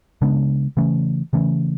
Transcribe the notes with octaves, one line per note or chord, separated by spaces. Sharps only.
C#3 G#3 B3 D4
C#3 E3 A3 C#4
C#3 E3 A3 C#4